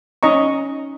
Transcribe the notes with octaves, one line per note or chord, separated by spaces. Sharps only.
C#4 D#4 D#5 A#5 C#6